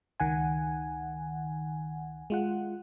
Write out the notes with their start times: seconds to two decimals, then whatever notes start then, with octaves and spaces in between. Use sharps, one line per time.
0.20 C#2 D#3 F#5 G#5
2.30 G#3 F4 F#5